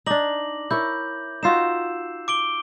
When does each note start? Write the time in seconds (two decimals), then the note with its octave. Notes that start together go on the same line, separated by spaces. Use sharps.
0.06 D4 D#4 D6 A#6 F#7
0.71 E4 A#4 C#5 G6
1.43 D#4 F4 F#4 E6 C7 E7
2.28 D6 D7 G7